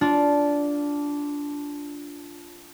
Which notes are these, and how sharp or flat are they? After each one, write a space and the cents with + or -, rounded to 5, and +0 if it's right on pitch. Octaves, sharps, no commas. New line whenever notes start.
D4 -15 F4 +0